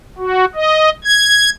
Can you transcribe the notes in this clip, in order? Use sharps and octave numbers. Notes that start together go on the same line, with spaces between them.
F#4
D#5
G#6